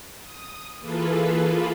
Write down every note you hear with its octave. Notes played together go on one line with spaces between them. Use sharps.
D#6
E3 A#3 F4 G#4 A4 B4